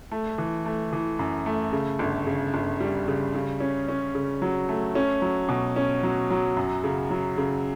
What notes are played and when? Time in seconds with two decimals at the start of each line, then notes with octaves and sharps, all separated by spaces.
0.11 A3
0.38 E3
0.66 A3
0.93 E3
1.19 F#2
1.46 A3
1.73 C#3
1.99 G1
2.27 C#3
2.54 G1
2.80 G3
3.08 C#3
3.35 C#3
3.60 C#4
3.88 C#4
4.15 C#3
4.42 F#3
4.69 A3
4.95 C#4
5.22 F#3
5.49 B2
5.76 C#4
6.03 F#3
6.31 F#3
6.57 F#2
6.84 C#3
7.10 F#3
7.38 C#3